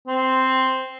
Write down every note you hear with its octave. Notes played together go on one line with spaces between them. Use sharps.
C4